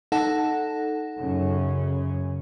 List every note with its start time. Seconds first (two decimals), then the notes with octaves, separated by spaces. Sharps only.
0.12 D#4 A4 F#5
1.18 F#2 C#3 C#4